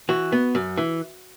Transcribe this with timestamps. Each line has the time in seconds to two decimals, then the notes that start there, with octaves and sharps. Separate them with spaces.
0.09 E3 F#4
0.32 B3
0.55 F#2
0.77 E3